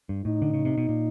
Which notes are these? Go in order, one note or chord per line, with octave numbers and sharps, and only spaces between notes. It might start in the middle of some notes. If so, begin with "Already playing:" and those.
G2
A2 D#4
D3
C#3
C3
B2
A#2